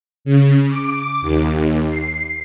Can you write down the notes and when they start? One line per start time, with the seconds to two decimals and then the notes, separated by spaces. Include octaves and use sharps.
0.25 C#3
0.69 D6
1.21 D#2
1.89 C7